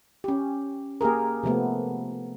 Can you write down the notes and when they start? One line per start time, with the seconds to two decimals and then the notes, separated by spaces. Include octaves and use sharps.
0.24 C#4 G4
1.01 A#3 G4 G#4 A#4
1.43 C3 F3 A3 B3